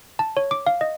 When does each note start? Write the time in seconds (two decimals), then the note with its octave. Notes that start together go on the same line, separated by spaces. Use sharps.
0.19 A5
0.37 C#5
0.51 D6
0.67 F5
0.81 D#5